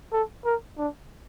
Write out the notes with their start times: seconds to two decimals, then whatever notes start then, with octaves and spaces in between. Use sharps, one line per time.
0.13 A4
0.45 A#4
0.78 D4